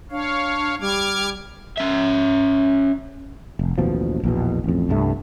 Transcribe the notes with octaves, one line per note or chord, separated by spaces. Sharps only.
D4 C#5 F5
G3 D6 F6 G#6
C#4 E5
F1
A1 D#2 B2 F3
A#1 E2 B2
A1 F2
C2 G2 A3